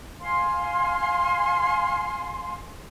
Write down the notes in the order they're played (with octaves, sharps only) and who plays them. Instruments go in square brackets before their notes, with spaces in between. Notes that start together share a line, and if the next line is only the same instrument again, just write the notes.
[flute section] F5 G#5 C6